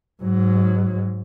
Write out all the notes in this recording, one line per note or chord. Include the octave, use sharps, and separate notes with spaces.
G#2 F#3